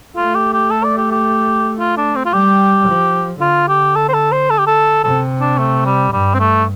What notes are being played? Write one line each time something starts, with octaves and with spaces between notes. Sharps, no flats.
A3 F4
G4
G4
A4
D5
G4
G4
F4
D4
C4
F4
G3 G4
F3
D3 F4
G4
A4
C5
A4
C5
A4
G4
A4
C3 A4
D4
A3
G3
G2 G3
C4
A3